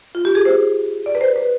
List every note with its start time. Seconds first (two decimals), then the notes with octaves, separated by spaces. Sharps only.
0.15 F4
0.25 G4
0.35 G#4
0.45 C5
1.06 D5
1.15 B4
1.21 C5
1.36 B4